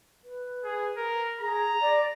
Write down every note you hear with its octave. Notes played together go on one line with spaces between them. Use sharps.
B4
G#4
A#4
G#4 A#5
D5